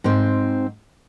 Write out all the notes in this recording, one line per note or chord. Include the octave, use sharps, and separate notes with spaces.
G#2 C4